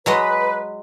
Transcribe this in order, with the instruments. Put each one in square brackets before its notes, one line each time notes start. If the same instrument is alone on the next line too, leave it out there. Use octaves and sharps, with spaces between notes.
[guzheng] F#3 G#3 D#5 [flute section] B4